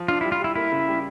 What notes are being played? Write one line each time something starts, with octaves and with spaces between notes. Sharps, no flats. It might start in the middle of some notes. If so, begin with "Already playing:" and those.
Already playing: F3
D4 F4
G3 E4
F4
G3 E4
A#3 E4
C#3
G3